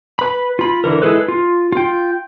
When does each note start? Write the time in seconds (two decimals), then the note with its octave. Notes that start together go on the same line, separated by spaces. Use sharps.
0.19 B4 B5
0.59 F4 B5
0.84 D3 E3 A#4
1.02 G#3 E4 G#4 A4 B4
1.28 F4
1.72 F4 G5